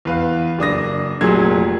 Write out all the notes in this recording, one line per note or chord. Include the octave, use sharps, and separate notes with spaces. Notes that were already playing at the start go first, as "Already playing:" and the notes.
E2 B4 F5
F#1 D4 D#6 A#6
F1 A#2 F#3 G#4 G#6